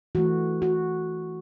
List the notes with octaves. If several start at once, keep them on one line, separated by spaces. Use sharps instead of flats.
E3 A3 F#4
F#4